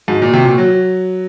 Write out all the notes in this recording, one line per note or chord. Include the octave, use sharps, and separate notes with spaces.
G#2 F#4
A#2
C3
A#2
F#3